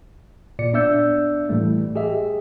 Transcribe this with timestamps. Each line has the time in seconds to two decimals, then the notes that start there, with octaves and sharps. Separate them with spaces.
0.59 A#2 D5 C#7
0.73 B3 D4 D5 E5 E6 G6
1.49 A2 E3 G3 A3
1.95 G4 G#4 D#5 E5